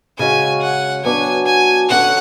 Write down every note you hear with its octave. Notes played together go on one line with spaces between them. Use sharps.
C#3 G#3 C#4 F#4 G#5
F#5
F#3 B3 D4 F#4 G#5
G#5
D3 F#3 C#4 F#4 A4 F#5